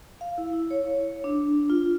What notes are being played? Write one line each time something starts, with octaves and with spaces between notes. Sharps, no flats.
F5
E4
E4
C#5
D4
F4